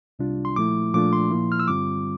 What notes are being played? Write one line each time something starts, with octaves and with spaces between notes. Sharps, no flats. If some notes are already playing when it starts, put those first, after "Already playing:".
C2 C3 G3 D4 F4
C6
A#2 F3 A3 E4 D6
A#2 F3 A3 D4 F4 D6
C6
A#2 F3 A#3 E4
F6
E6
G2 D3 G3 C4 F4 D6